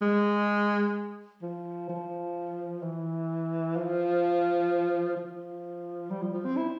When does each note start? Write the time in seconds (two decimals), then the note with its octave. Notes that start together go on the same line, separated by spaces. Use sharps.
0.01 G#3
1.42 F3
1.89 F3
2.82 E3
3.76 F3
5.17 F3
6.10 G3
6.22 F3
6.33 F3
6.45 C4
6.56 E4